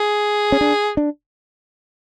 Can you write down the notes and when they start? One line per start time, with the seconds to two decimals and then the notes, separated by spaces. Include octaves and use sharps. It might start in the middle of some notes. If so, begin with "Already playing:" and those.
Already playing: G#4
0.52 C#4
0.61 D4
0.97 D4